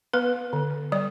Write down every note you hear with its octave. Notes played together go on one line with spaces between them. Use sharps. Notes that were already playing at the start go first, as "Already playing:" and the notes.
B3 B4
D3
G3 D5